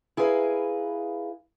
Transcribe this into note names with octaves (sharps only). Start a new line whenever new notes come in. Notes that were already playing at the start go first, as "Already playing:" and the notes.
E4 G#4 A#4 B4 F5